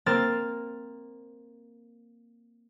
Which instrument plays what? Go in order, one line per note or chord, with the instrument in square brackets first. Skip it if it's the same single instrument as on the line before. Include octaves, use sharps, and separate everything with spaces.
[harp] A#3 C4 F6 A6